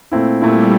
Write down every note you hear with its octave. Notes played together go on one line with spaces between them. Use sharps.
A#2 A3 C4 E4
A#2 G3 A3 C4 E4